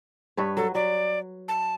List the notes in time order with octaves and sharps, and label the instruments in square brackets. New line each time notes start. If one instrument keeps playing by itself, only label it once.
[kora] G2 B4 C#5
[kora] F#3 [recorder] A4
[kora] F#3 [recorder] D5
[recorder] A5